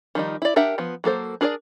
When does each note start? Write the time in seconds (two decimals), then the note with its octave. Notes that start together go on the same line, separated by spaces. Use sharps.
0.15 D#3 F3 G3 D#4
0.42 E4 D5
0.56 D4 G4 A#4 E5 F#5
0.78 F3 B3
1.04 F#3 A#3 A4 C5
1.41 D4 G#4 A#4 C5 D5